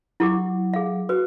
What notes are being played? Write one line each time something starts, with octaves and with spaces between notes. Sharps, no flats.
F#3 E4 G4 D6
G#4 F5
F#4 B4